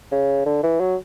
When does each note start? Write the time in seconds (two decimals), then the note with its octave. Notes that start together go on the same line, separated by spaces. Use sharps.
0.12 C#3
0.46 D3
0.63 E3
0.80 F#3